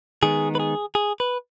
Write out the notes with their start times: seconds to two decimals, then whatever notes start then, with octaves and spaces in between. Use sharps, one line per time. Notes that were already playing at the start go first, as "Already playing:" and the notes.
0.23 D#3 G#3 B3 D#4 G#4
0.55 B4
0.60 G#4
0.95 G#4
1.20 B4